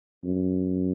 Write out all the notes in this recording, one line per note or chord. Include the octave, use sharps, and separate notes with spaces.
F#2